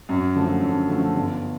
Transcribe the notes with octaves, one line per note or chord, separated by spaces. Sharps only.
F#2
D3 F3 A3
F#2
D3 F3 A3
G1